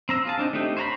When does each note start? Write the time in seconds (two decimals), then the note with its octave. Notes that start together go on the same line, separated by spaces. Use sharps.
0.09 C4 A#5 E6
0.25 F4 G#4 A5
0.38 C4 D4 D#4
0.53 A3 C4 D4 D#4 G4
0.77 C5 C#5 F#5 A#5 B5